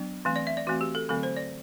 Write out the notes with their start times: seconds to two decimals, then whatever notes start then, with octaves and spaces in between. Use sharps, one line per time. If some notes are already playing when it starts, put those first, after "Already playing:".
Already playing: F#3 B3 D4
0.25 E3 A3 C4
0.36 D5
0.47 E5
0.57 D5
0.67 E3 A3 C4 F#4
0.81 G4
0.95 A4
1.09 D3 F#3 A3 C4 A4
1.23 C5
1.36 D5